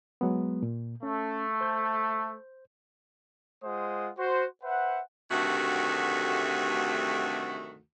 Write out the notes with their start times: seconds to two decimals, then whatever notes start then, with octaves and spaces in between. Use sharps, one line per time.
0.21 F#3 G#3 B3
0.63 A#2
1.03 A3 C#4
1.61 C5 G6
3.64 G#3 F4 C5 F#5 D#6
4.18 F#4 C5
4.63 B4 C5 E5 F#5
5.30 D2 G2 C3 D#3 A3 F#4